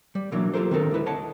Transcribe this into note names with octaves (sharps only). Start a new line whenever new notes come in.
G3
B2 E3 F#3 A#3 D4
F4 G4 A4 A#4 C5
D#3 C4 D4 A4 A#4
D2 G#3 E4 B4
C#5 D#5 F#5 A5